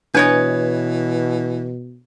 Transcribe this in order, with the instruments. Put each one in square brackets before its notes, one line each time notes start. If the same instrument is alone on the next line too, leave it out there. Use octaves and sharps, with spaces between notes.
[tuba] B2 [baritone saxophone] E3 [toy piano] D4 G#5 [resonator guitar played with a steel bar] B4 C#5 D#5